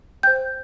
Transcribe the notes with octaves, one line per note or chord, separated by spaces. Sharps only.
C5 G5 G6